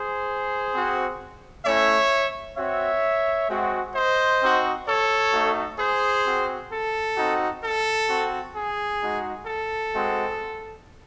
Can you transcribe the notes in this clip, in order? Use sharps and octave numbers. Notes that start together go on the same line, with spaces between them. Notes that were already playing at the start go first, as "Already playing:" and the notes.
Already playing: G#4 C5
C4 F#4
A3 C#4 E4 C#5 E5
C4 F#4 C#5 E5
G#3 C4 F#4
C5 D#5
C4 D#4 F#4
A4 C#5
A3 D#4 F#4
G#4 C5
C4 F#4
A4
C4 D#4 F#4
A4
C4 F#4
G#4
G#3 D#4 F#4
A4
G#3 C4 F#4